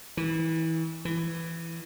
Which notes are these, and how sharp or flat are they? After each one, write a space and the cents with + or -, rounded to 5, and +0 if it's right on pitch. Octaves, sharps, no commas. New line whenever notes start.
E3 -25
E3 +10